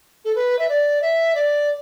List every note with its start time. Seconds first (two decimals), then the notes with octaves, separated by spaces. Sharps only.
0.24 A4
0.35 B4
0.58 E5
0.68 D5
1.01 E5
1.34 D5